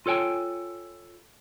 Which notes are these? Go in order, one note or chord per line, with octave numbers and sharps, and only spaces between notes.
F4 A4 C#5 G5 G#5